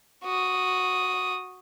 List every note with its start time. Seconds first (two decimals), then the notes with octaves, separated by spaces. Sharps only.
0.23 F#4 D#6